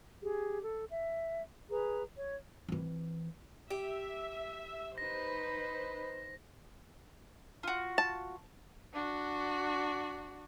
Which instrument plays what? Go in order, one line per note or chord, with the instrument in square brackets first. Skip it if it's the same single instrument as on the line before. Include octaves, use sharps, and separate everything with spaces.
[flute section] G4 G#4
A4
E5
G#4 B4 A#5
C#5
[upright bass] E3 C4
[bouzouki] G4 [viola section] E5
[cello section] D#4 B4 [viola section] C5 [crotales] A#6
[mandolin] F4 F#4
[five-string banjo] A5
[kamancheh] D4 F#4